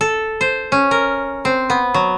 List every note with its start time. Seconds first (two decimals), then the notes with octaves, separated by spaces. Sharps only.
0.01 A4
0.41 C5
0.72 C#4
0.91 A#4
1.45 C4
1.70 B3
1.94 F#3